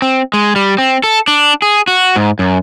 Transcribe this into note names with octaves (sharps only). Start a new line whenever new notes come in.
C4
G#3
G3
C4
A4
D4
G#4
F#4
G#2
F#2